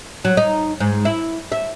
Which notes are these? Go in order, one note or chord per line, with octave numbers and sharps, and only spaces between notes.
F#3
D#4
G#2
E4
E5